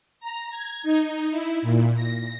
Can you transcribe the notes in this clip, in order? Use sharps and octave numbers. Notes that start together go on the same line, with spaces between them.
A#5
G#6
D#4
E4
A#2
A#6